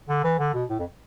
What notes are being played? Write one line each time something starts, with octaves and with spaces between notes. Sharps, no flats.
D3
E3
D3
B2
A2
F2